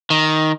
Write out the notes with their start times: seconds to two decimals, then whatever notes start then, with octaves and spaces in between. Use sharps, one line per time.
0.10 D#3